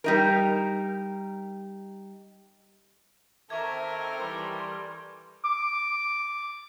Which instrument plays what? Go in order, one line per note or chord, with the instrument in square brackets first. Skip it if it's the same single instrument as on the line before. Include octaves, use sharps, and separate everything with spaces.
[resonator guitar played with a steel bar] G3 D#4 A#4
[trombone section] D#3 C4 [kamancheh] A4 A#4 [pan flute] E5 [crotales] C#6 D6 G#6
[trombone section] E3 G3 [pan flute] C6
[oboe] D6